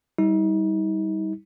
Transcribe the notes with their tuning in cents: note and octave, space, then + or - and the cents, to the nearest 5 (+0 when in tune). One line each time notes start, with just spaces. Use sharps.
G3 +0 D#4 +40